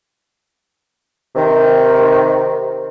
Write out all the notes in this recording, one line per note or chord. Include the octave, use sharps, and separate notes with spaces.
C3 D#3